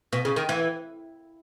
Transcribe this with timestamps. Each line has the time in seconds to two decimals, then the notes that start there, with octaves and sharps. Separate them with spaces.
0.13 B2
0.25 C#3
0.36 D#3
0.49 E3